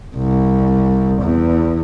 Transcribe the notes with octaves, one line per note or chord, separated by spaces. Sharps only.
C2
E2